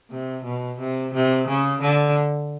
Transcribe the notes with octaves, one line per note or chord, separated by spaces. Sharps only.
C3
B2
C3
C3
C#3
D3